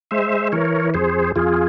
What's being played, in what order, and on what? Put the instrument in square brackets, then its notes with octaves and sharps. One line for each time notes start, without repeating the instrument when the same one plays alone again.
[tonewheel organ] G#3 C5 E5
E3 A#4 C#5
F2 G#4 C5
F2 F4 G#4